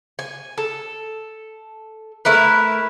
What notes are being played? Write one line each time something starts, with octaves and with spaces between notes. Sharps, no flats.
G#5
A4
A3 E4 A#4 B4